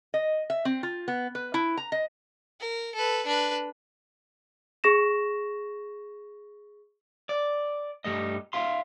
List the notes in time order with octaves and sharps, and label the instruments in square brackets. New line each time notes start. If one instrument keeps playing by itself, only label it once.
[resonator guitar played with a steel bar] D#5
E5
C4
F4
B3
B4
E4
A#5
D#5
[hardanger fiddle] A#4
A4 B4
D4 B4
[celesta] G#4 C#6 A#6 E7
[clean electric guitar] D5
G2 D#3 G3 A3 D#5
E5 F5 C6